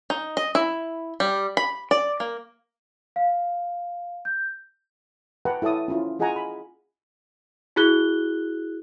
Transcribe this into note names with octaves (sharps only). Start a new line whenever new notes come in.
D#4
D#5
E4
G3
B5
D5
A#3
F5
G6
B4 F#5 G5 A5 A#5
E4 A4 C#5 A5 D#6
C#4 E4 F4
F4 G#4 D#5 F#5 G#5 A#5
B5
E4 F#4 G#4 F#6 G7